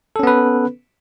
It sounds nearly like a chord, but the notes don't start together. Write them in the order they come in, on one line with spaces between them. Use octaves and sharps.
A4 C#4 B3 B4